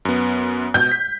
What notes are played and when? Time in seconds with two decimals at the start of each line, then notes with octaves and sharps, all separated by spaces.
0.05 F#2 B3
0.74 B2 G6
0.92 B6